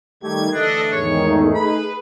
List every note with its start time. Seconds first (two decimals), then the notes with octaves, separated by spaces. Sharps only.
0.23 D#3 G3 A3 D#4 G4 G#6
0.53 D3 E3 A3 D4 A4 D#5
0.92 E2 G#2 D#3 G#4 C#5
1.26 A3 D#4
1.55 B4 B5